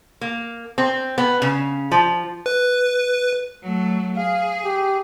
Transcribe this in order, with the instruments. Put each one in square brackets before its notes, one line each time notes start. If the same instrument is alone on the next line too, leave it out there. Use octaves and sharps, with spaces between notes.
[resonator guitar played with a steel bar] A#3
C4
B3
C#3
F3
[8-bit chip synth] B4
[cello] F#3 A3
[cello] G#4 [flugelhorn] F5
[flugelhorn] G4